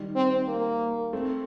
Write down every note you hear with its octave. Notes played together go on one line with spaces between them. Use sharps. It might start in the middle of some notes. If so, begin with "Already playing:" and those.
Already playing: D#3 G3
C4
A#3
A3 C4